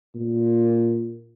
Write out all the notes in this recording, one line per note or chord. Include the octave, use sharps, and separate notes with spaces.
A#2